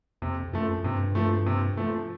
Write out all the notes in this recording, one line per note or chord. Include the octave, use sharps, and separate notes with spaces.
F2 C3
F#2 F3 A3
G2 C3
F3 A3
C3
F3 A3